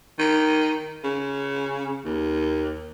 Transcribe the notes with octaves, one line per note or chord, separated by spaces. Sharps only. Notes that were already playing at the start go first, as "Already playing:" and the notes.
D#3
C#3
D#2